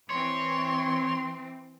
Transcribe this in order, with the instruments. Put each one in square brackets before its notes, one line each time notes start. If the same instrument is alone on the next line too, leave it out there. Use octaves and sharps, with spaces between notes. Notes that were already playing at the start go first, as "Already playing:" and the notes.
[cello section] E3 C4 [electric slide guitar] C#5 [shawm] C6